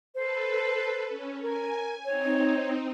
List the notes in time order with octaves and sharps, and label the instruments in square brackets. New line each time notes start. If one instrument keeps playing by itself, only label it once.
[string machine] A4 B4 [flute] C5
[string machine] C#4
[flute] A#4 [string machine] G#5
[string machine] C4 D#4 [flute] C#5